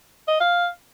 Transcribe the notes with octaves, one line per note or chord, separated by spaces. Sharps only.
D#5
F5